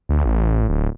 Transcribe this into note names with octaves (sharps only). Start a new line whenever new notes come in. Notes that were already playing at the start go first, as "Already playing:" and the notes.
D2
A1
D1